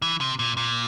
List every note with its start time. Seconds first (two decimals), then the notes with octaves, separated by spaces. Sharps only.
0.02 E3
0.21 C3
0.39 A#2
0.57 A#2